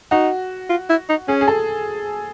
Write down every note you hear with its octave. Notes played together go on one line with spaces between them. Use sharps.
D#4 F#4
F4
E4
D#4
C#4 G#4
G#4
A4